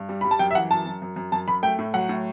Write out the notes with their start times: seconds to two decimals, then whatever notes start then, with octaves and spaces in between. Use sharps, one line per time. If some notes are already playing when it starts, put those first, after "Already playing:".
Already playing: G2
0.09 G3
0.21 G3 B5
0.31 A5
0.39 F#2 G5
0.51 E5
0.55 E3 F#5
0.71 F#2 A5
0.86 F#2
1.02 F#2
1.16 F#2
1.32 F#2 A5
1.48 F#2 B5
1.63 A3 G5
1.79 A2
1.94 F#3 F#5
2.09 A2